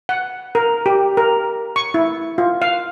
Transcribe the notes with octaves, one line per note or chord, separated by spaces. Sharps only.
F#5
A#4
G4
A#4
C#6
E4
F4
F5